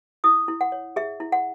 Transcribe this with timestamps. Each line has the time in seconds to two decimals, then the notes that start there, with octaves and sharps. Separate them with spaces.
0.24 E4 D#6
0.48 E4
0.61 F#5
0.72 C#5
0.96 G#4 E5
1.20 E4
1.32 F#5